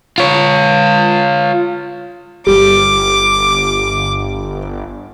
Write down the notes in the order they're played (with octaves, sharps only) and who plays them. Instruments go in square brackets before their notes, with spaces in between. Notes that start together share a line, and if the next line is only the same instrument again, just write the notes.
[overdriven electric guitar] F4 C#5
[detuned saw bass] G1 [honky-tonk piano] G3 [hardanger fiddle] D6